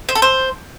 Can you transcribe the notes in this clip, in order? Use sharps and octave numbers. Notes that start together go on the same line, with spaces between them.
C5
A4
C5